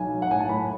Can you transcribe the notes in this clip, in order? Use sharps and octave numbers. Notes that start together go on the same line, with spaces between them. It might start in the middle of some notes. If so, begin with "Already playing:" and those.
Already playing: B1 G#5
F#3
F#5
A2 G#5
A5
A2 B5